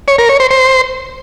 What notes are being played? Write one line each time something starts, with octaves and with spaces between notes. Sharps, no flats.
C#5
A#4
C#5
C5
C5